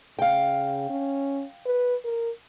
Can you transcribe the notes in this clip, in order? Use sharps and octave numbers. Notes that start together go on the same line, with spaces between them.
C#3 F5 G5
C#4
B4
A#4